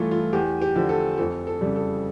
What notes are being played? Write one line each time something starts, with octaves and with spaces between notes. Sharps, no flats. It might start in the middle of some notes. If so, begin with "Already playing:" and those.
Already playing: G2 E3 A3 F4 A4
F4
E2 G4
G4
D3 F3
A4
F2 A4
A4
C#3 G3
A4